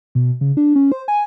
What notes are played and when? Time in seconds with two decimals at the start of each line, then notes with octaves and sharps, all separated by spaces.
0.15 B2
0.41 C#3
0.57 D4
0.76 C#4
0.92 C5
1.08 G#5